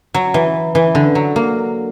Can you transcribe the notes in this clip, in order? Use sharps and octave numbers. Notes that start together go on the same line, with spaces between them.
F#3
E3
E3
D3
F#3
A#3